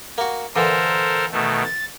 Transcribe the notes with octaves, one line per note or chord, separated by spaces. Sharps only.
A#3 F#4
A#2 D3 E3 A4 A#4 C5
B2 D#3 A3
A6